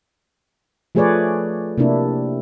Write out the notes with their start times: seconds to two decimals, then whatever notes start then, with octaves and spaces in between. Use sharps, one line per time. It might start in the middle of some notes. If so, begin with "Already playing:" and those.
0.95 F3 A3 G#4 B4 C#5 D5
1.78 C3 A#3 D4 E4